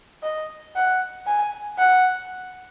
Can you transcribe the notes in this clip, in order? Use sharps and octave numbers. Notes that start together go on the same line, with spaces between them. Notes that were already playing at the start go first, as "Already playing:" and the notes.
D#5
F#5
G#5
F#5